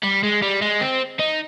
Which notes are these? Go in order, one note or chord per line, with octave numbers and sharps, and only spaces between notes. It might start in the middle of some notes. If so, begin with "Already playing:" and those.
G3
G#3
G3
G#3
C4
D#4